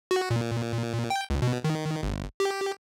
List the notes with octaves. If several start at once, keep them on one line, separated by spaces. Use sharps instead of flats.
F#4
A#2
G5
C#2
B2
D#3
G1
G4